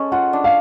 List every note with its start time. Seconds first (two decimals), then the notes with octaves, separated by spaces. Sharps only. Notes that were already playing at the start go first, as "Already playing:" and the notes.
Already playing: G#3 C#4 A4
0.12 F4 F#5
0.33 D4
0.44 F5